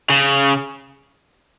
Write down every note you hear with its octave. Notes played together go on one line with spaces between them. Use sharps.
C#3